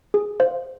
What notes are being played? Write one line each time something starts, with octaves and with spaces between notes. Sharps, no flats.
G#4
C5 F5